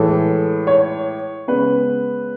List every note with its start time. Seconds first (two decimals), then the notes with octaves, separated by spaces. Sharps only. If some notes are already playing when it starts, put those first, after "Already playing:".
Already playing: A2 E3 G#3 A4
0.67 C#5
1.48 C#3 G#3 B3 B4